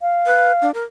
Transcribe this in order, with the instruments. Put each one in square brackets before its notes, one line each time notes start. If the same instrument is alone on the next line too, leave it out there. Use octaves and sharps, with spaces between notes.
[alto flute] F5
[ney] B4
D4
A#4